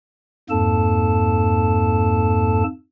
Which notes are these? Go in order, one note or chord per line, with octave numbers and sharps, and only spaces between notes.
F2 G#2 A#3 A4 A5